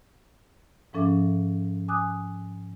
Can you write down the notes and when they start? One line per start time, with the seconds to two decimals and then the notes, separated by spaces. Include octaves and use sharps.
0.93 G#2 F3 C#4 A4 E5 D6
1.88 G#5 D6 D#6 F#6